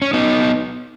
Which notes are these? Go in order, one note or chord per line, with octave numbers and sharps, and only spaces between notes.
C#4
B3 D#4